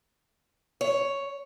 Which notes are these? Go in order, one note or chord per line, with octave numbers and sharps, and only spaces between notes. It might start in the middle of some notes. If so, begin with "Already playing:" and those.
C#5